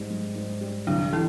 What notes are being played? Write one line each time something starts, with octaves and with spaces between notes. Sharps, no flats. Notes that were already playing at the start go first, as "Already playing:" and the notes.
Already playing: G#2 G3
G#2
G#2
G3
C2 D3 D4
E3 E4